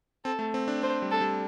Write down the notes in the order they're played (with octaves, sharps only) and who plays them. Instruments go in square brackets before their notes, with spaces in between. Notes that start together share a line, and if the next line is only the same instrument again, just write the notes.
[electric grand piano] C4 [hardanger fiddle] A4
[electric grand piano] A3
C4
D4
[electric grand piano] C4 [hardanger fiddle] C5
[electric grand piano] G3
[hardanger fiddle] A4
[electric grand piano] G3